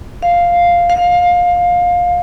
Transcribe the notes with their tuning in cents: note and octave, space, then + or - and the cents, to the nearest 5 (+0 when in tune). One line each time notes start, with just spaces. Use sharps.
F5 +0
F5 +20